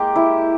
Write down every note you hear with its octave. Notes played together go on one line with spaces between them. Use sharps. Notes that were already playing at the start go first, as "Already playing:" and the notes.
Already playing: G#3 A#3 G4
E4